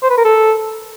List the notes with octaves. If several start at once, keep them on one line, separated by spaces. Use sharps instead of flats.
C5
B4
A#4
A4